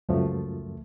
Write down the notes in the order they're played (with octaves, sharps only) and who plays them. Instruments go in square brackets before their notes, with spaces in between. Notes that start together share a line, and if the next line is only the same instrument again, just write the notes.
[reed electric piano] C#2 F#2 F3 A3